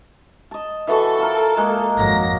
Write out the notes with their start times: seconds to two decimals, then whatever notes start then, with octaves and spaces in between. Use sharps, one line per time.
0.51 D#5 A5
0.87 E3 F#4 A4 C#6
1.19 F4 A#4
1.57 G#3 A#3 D#5
1.99 G#1 F2 F#3 D#5 A#6